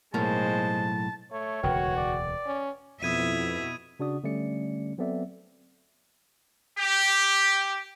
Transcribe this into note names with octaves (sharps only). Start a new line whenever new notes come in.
B1 A2 G#3 A#3 C5 A5
A3 C#5
E1 D2 C#3 F#4 B4 G5
D5
C#4
F2 B2 E4 E5 D#6 G#6 D#7
C#3 D4 F#4 D5 D#6
D3 G3 A3 C#4 D5 C#7
F#3 B3 C4 A4 D5 E5
G4